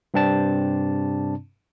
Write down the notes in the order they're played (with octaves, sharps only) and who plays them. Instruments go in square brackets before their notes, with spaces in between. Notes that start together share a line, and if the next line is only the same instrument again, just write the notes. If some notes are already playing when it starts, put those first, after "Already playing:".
[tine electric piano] G2 C3 C4 D4 A5